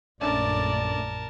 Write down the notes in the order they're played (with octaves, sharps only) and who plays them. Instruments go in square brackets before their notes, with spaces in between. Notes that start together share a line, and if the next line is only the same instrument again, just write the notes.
[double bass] A#1 F#2 [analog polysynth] A3 C#4 D4 [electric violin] A#4 A5 [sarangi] D5